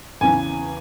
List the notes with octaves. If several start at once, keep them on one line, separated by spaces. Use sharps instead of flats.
E2 C#3 E3 G#5